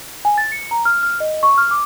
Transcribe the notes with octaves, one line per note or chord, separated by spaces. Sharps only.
G#5
A6
C#7
A#5
F6
F6
D#5
C#6
F6
D6